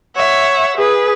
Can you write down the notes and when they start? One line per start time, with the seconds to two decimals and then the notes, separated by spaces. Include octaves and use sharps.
0.16 C#5 E5 F#5
0.77 G#4 B4